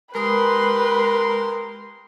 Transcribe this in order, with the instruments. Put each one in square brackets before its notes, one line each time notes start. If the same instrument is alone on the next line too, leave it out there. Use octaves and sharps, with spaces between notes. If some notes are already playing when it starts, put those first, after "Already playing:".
[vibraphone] G#3 D#6 [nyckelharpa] G4 C6 [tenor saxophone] A#4 [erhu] B4